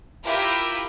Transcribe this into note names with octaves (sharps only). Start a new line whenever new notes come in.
E4 F4 G4 A#4 E5 G5